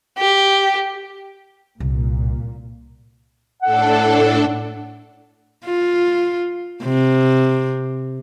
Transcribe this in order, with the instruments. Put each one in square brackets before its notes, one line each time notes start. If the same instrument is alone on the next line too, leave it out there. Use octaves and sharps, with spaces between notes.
[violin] G4
[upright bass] C2 [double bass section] A#2
[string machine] A2 D4 A4 [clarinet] F#5
[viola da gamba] F4
C3